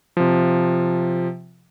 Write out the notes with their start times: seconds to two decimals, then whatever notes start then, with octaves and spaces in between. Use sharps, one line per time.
0.17 C3 F3